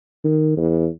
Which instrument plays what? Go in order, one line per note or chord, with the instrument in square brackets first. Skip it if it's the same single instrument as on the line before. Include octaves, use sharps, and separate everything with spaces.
[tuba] D#3
E2